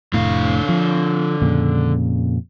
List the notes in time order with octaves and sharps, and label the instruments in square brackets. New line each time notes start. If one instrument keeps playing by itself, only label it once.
[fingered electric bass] F1 A2 [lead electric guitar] D3 F5
[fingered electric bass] F3
F2 A#2 C#3